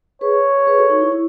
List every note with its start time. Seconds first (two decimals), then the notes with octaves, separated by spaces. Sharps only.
0.21 G#4 B4 C#5
0.67 G#4 B4
0.78 F#4 A4
0.89 D#4 F#4
1.01 E4
1.12 E4